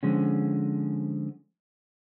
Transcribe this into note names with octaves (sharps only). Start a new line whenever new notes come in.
D3 F3 G#3 C#4